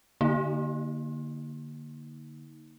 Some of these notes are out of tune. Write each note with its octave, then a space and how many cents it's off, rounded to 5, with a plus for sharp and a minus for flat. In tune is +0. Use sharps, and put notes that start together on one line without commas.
D3 +0 A#3 +0 D#4 +20